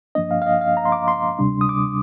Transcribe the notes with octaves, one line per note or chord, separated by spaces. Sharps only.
G2 F3 A#3 D4 D#5
F5
F5
D#5
F5
A#5
C6
D6
C6
D2 C3 G3 D4
D#6
D6